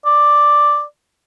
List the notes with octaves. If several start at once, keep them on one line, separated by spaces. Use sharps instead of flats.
D5